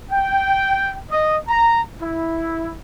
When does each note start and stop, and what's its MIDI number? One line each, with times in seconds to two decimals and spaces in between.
0.10 0.96 79
1.10 1.36 75
1.48 1.81 82
2.00 2.72 64